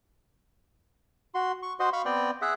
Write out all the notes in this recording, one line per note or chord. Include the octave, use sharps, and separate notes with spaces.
F#4 C6
C#6
F#4 C5 D#5 C6
F5 B5 C#6
B3 C4 D5 G5
G#4 E5 F#5